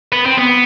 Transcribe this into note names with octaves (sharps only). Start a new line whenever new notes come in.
B3
C4
B3